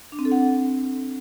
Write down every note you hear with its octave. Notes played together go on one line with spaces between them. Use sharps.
D4
C4
A4
F#5